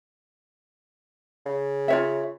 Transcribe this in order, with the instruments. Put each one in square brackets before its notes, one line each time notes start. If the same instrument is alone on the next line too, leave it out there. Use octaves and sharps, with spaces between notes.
[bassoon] C#3
[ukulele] F4 C#5 E5